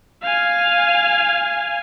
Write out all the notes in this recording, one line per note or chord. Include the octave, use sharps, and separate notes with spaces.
F5 G#5